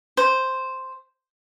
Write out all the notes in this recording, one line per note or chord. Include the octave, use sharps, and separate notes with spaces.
C5